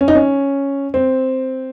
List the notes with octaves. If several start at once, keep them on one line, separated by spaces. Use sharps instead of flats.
C#4
D#4
C#4
C4